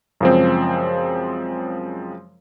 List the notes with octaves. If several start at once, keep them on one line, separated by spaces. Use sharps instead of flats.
F#2 C#3 F3 G#3 C4